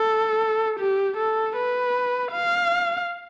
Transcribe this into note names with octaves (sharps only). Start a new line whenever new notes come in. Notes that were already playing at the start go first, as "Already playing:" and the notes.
Already playing: A4
G4
A4
B4
F5